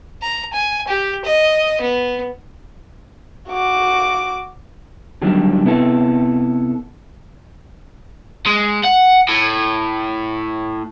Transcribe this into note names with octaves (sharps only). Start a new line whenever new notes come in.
A#5
G#5
G4
D#5
B3
F#4 D6
D3 D#3 F#3 G3 A3 D4
C3 B3 E4 A4
G#3
F#5
A2